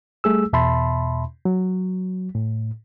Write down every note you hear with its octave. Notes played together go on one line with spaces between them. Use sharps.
G3 A3 G#4 E6
E2 B2 E5 A5 B5 C6
F#3
A2